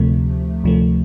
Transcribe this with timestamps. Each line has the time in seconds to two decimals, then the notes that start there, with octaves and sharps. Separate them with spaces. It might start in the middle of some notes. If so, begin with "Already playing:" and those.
Already playing: D2 C3 F3 A3
0.64 D2 C3 F3 A3